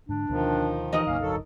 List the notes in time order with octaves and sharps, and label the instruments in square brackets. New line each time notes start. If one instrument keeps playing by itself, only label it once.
[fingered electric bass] G#2 D3 [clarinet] D4
[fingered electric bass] D2 B2 [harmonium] D#3 F3
[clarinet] E3 [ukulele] D#4 A#4 D#5
[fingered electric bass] B1 F#2 C#3 [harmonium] A#3 C#4 [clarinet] F5
[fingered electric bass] D1 G1 D3 [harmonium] F#3 A4